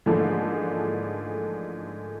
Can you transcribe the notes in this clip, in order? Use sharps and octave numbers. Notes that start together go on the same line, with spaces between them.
G#2 D3 E3 F3 A3 A#3